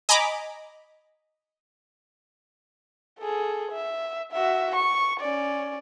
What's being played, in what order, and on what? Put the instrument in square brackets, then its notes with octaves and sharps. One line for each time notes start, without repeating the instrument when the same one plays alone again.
[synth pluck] D#5 G#5 A#5 B5 D6
[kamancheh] G#4 A4
E5
F#4 E5
C#6
C#4 D5